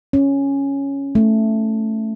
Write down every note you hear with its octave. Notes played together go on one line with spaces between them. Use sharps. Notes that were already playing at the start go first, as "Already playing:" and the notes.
C#4
A3